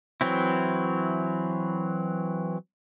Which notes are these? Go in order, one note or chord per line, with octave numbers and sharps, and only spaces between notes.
E3 F#3 C4 E4